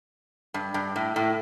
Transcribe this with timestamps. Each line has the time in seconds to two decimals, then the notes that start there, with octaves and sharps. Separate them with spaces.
0.54 G2
0.74 G2
0.96 A2
1.16 A2